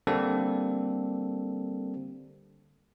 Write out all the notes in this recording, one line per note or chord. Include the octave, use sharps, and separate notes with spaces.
D3 G3 A#3 C4 A4